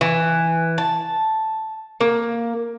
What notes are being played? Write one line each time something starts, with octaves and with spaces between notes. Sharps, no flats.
E3
A5
A#3